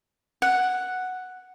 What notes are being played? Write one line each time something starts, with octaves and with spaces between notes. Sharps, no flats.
F#5